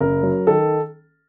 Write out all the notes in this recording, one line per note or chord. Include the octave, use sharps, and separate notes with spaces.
F#1 A#4
F#3
D#3 A4